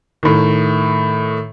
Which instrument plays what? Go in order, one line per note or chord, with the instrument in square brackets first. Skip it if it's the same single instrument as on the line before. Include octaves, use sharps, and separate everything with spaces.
[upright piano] A2 D#3